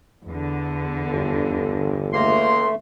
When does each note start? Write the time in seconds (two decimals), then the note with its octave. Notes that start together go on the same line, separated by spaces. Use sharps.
0.26 E2 D3
1.12 G1
2.13 C#2 A3 A#3 C6